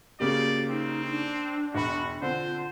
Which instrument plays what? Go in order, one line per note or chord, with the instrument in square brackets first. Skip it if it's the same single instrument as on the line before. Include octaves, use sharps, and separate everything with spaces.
[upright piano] C#3 A#3 G4 [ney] F#4 [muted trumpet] D5
[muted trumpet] C4 [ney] D#4
[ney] D4
[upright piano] E1 B5 [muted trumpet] F#4
[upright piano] D3 C4 [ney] F4 [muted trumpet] C5